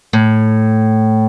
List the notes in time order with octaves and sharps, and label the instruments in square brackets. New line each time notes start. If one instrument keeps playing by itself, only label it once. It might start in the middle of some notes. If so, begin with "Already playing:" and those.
[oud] A2